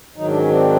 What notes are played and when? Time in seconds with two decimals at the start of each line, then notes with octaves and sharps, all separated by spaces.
0.17 G#2 D#3 F#3 D#4
0.28 D4
0.39 C#4
0.49 C4 D4